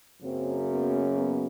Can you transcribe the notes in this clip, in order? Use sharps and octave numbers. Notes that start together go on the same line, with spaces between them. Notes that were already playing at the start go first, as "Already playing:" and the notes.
F#2 C#3 F#3 A#3 C4
B3
B3